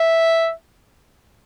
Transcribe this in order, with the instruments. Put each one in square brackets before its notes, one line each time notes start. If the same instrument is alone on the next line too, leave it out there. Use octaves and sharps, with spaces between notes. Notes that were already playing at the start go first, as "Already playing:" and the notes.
Already playing: [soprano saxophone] E5